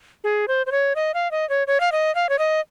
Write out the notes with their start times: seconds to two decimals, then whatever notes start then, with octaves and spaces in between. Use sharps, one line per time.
0.24 G#4
0.48 C5
0.66 C5
0.72 C#5
0.96 D#5
1.14 F5
1.31 D#5
1.49 C#5
1.67 C#5
1.80 F5
1.92 D#5
2.15 F5
2.29 C#5
2.39 D#5